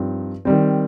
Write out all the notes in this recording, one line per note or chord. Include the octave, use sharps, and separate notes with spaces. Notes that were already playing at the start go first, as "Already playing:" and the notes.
Already playing: G2 F3 C4 D#4
D#3 G3 C4